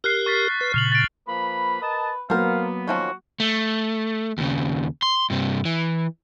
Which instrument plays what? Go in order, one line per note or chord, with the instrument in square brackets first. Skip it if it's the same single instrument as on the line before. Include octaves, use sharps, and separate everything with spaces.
[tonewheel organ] G4 A#4 [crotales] F6 F#6 C7
[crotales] C#6 A6 B6
[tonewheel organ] B4
[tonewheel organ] A#2 C#3 [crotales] F6 F7 F#7
[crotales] A6 D7
[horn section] F3 A#3 B5 [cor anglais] B4
[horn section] A#4 D#5 A5
[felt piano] F#3 A#3 [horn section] B3 [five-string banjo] A#4 C5 [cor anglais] F5
[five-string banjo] D#3 F3 C#4 [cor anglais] F#4
[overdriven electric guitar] A3
D#2 C#3
C6
G2 C3
E3